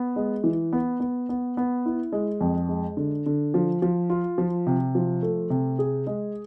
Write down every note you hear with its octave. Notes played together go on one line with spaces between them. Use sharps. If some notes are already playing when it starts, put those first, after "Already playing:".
Already playing: B3
G#3
E3
B3
B3
B3
B3
E4
G#3
F2
G#3
D3
D3
F3
F3
F4
F3
C3
F3
A3
C3
G#4
G#3